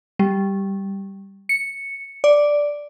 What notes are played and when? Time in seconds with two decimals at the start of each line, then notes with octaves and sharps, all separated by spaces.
0.19 G3
1.49 C#7
2.24 D5